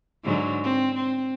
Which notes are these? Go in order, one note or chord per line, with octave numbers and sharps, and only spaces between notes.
G#2 D3 F#3
C4
C4